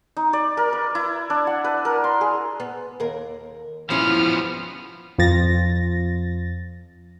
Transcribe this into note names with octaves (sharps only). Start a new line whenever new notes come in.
D#4
D5
A#4
B4
E4
D4
F#5
B4
A#4
C6
G#4
B3
D#2 A#4
F3 G3 B3 C#4 E4 F6
F2 F3 A6 A#6